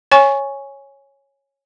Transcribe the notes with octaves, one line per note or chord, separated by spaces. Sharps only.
C#5 G#5 C#6